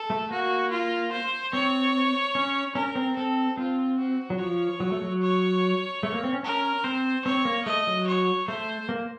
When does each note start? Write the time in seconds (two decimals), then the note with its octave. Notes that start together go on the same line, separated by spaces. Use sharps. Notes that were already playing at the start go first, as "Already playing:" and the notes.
Already playing: A4
0.10 A3
0.31 A#3 F#4
0.71 F4
1.12 C5
1.53 C4 C#5
2.35 C#4
2.75 C#4 A#4
2.95 C4
3.16 C4 A4
3.57 C4 F4
3.98 F#4
4.30 F#3
4.39 F3 C#5
4.80 F#3
4.92 A3
5.02 F#3
5.22 C#5
6.03 A3
6.12 A#3
6.24 C4
6.33 C#4
6.43 C#4 A#4
6.84 C4 C5
7.25 C4 C#5
7.45 A#3
7.66 A3 D#5
7.87 F#3
8.07 C#5
8.48 A3 C5
8.89 A#3